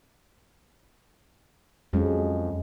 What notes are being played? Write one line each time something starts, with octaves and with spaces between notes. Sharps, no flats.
F2 F#3 G#3 C#4